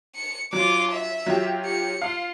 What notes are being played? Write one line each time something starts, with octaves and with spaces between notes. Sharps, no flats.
C#7
F#3 F4 D6
E5
F#3 F4 G4
C#7
F4 F5